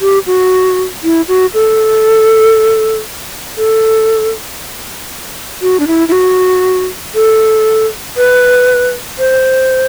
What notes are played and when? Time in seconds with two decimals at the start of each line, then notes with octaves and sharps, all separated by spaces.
0.01 G4
0.27 F#4
1.04 E4
1.28 F#4
1.54 A4
3.58 A4
5.62 F#4
5.80 D4
5.87 E4
6.08 E4
6.12 F#4
7.15 A4
8.17 B4
9.19 C5